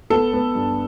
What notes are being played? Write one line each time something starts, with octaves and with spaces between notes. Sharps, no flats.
B3 A4
B3
G2